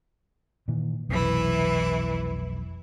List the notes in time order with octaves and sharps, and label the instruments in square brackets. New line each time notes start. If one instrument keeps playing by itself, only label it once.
[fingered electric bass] A#2 D#3 E3
[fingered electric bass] F1 B1 [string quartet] E3 E4